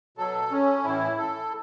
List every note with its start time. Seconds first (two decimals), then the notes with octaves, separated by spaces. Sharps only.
0.18 B2 F#3 A4
0.51 C#4
0.84 A2 E3 E4
1.18 A4